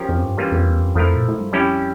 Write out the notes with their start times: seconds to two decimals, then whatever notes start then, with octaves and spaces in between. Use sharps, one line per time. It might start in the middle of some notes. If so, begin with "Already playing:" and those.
Already playing: F3 C#4 G4 A#4
0.09 F2
0.24 G2
0.38 E3 G3 A#3 C#4 F4
0.52 F2
0.67 E2
0.80 F2
0.95 F2 F3 A3 E4 A#4
1.16 A#2
1.28 A2
1.40 G2
1.53 F2 G3 C#4 E4 G4